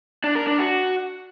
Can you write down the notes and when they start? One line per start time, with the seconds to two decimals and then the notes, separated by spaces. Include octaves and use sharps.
0.24 D4
0.35 A#4
0.47 D4
0.59 F#4